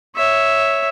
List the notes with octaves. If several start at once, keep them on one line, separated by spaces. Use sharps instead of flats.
C#5 E5